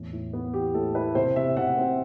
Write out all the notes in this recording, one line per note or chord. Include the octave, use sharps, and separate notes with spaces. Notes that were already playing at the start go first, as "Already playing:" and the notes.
Already playing: E2 A2
A2
B3
E3 G4
A2 A4
E4 B4
C3 C5
C3 E5
C3 F#5
C4